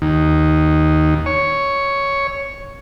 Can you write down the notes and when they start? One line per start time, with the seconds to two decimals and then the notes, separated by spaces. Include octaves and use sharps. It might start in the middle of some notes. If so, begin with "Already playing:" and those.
0.02 D#2
1.26 C#5